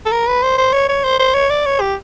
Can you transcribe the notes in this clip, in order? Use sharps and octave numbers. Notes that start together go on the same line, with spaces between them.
A4
A#4
B4
C5
C5
C#5
C#5
C5
C5
C#5
D5
C#5
G4